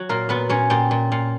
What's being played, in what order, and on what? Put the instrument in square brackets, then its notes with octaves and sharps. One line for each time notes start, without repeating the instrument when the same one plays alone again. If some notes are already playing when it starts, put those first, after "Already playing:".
Already playing: [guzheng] F#3 F#4
A#2 A#3 A#4
A#2 B3 B4
A#2 C#4 C#5
A#2 G4 G5
A#2
A#2